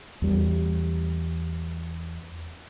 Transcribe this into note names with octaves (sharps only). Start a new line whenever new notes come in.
E2 G3